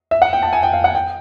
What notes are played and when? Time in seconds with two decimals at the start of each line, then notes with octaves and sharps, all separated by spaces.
0.11 E5
0.22 F#5
0.33 G5
0.42 A5
0.53 G#5
0.63 G5
0.73 F5
0.84 F#5
0.95 G5